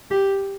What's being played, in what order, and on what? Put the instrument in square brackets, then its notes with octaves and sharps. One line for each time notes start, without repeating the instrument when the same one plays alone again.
[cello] G4